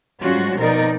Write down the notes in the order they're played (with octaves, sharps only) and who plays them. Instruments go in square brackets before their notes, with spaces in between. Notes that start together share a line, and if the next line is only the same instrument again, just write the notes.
[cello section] G#2 F#3 G3 C#4 F4 F#4
B2 F3 C4 D#4 A#4 D5